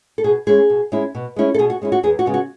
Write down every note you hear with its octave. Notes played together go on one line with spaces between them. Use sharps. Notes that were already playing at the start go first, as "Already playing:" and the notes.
A4
B2 G#4
G#3 C#4 E4 G#4
B2
G#3 C#4 E4
B2
G#3 C#4 E4
A4
B2 G#4
F#4
G#3 C#4 E4
F#4
E2 G#4
F#4
C#3 G#3 B3
F#4